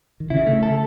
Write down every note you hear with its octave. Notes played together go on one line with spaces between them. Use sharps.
D#3
C#3 E4
A3
C#3
A4